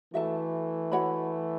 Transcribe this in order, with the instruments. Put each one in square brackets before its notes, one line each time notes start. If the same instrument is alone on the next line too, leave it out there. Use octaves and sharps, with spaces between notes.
[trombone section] E3 A3 [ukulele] F#4 A4 E5 A5
[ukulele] F#4 C#5 F#5 B5